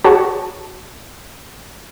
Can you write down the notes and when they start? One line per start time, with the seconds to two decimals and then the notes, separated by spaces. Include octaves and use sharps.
0.04 F#4 G#4 C#5 A5